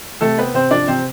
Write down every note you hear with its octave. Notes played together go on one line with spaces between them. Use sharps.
C3 A3 A4
B3 C4 B4
C3 C4 C5
F3 D4 D5
C3 C4 C5